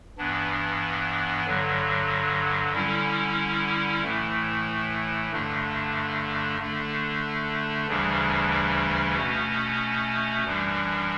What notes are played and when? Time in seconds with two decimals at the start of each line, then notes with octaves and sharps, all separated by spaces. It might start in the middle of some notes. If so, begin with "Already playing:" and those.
0.18 G2 E3 B3 D4
1.46 G2 D3 F#3
2.74 D3 G3 C#4 E4
4.03 A2 E3 A3
5.31 G2 D3 A3 D4
6.59 D3 A3 D4
7.88 D2 C#3 E3 G3 D4
9.16 B2 A3 C#4
10.44 F#2 E3 G3 D4